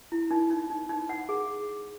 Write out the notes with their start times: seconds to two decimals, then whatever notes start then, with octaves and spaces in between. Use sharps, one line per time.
0.12 E4
0.31 D#4
0.50 D#4
0.70 D#4
0.89 D#4
1.09 F#5
1.29 G#4